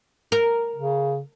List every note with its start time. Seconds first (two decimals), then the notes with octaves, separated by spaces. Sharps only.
0.32 A#4
0.76 C#3